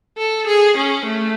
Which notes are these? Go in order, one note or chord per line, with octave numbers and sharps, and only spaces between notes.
A4
G#4
C#4
A3